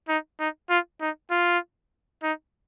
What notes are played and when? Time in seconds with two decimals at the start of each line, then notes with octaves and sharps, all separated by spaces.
0.08 D#4
0.39 D#4
0.69 F4
1.01 D#4
1.31 F4
2.23 D#4